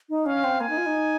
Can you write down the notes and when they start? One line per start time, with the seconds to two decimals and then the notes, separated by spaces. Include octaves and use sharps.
0.09 D#4
0.26 C#4 F5
0.44 C4
0.60 A#3 G#5
0.70 D#4
0.77 F4
0.86 D#4